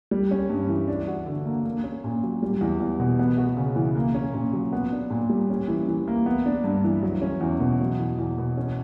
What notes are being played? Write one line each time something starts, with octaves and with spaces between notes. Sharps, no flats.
G3
C#4
G2
E3
D4
F#4
D3
A#3
A#3
C#4
A#2
F#3
G3
E2
E2
B2
B3
F#4
C#3
E3
A#3
C#4
A#2
F#3
B3
D4
A#2
G3
C#4
E3
E3
A#3
B3
D4
G2
E3
F#3
C#4
E2
B2
F#3
E2
E2
B2
C#4